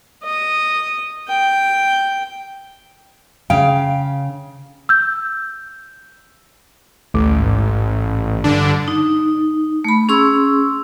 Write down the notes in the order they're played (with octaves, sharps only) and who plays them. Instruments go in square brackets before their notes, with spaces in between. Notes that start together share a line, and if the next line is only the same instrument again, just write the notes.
[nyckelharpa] D#5
G5
[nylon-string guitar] C#3 F5 G5
[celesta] E6 G6
[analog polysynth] A1 [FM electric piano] D2 A3 D6
[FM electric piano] G#2
[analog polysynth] G2 D3 D4
[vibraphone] D#4
A3 B5
C#4 G#4 C6 C#6 E6